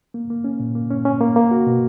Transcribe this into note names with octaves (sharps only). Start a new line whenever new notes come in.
A#3
A#3
C#4
A#2
A#3
C#4
C#4
A#3
A#3
F#4
B2